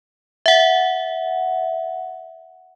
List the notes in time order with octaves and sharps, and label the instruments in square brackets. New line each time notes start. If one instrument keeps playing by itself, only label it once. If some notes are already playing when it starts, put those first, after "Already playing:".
[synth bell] E5 F#5